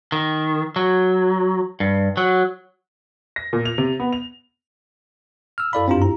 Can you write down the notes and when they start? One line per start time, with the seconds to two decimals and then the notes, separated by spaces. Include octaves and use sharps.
0.12 D#3
0.76 F#3
1.80 G2
2.17 F#3
3.36 A#6
3.53 A#2
3.65 F7
3.78 C3
4.00 B3
4.13 F7
5.58 E6 F6
5.73 F#2 E4 A4 D5 F5 B5
5.88 G2 C4 D4 F4 G4 A#5
6.02 E4 A#5